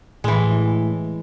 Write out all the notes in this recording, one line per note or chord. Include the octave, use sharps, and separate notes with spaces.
A2 E3 G#3